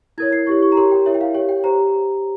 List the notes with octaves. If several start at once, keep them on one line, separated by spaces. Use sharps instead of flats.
E4 A#4 C#5 G#6
C7
E4 G4 C#5 C#6
C#6
A#5
G4 A#4 C#5 C6
G5
E4 A#4 C#5 E5
G5
F5
G4 C#5 G5
G5
G4 C5 A#5